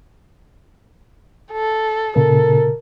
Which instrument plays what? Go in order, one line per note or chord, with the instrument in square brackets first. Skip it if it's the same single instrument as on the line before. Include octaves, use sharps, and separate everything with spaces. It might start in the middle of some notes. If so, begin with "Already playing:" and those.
[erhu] A4
[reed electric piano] A#2 C#3 [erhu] A4 [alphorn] A#4